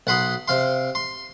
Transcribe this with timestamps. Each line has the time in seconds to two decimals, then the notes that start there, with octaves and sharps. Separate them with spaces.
0.07 B1 F#5 B5 C6 D#6
0.48 C3 F5 C6
0.95 C6